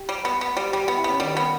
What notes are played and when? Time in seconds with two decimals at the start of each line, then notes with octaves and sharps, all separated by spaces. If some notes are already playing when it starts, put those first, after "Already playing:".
Already playing: G4
0.09 G3
0.25 B3
0.41 B3
0.57 G3
0.72 G3 G4
0.85 B3 G4
0.96 E4
1.04 B3 C#4
1.20 D#3 G3
1.37 B3